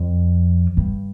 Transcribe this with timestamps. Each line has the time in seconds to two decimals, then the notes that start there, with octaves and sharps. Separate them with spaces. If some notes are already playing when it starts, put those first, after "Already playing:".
Already playing: F2
0.77 G2